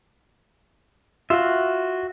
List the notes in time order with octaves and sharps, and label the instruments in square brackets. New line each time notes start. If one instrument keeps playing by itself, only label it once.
[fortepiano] F4 [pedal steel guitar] F#4 E5